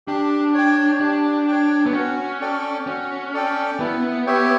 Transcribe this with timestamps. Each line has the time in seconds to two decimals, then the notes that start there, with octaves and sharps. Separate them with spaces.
0.07 D4 G4
0.54 C#5 G5
1.01 D4 G4
1.48 C#5 G5
1.86 B3
1.94 C#4 F#4
2.41 A4 D5 G5
2.87 C#4 F#4
3.34 A4 D5 G5
3.80 B3 E4
4.27 G4 C#5 E5 G5